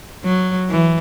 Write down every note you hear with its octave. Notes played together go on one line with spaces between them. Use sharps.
F#3
E3